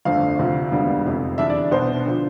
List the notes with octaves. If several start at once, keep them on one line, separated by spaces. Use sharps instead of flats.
G1 F2 D3 A3 C4 F5
D2 C3 F3
E1 D2 D3 G3 B3
F1 F2 C3
E2 D3 G3 D4 E5
D5
C2 B2 B3 D4 C5
D3 F3